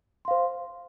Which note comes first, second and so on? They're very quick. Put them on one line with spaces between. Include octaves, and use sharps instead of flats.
C6 F5 C5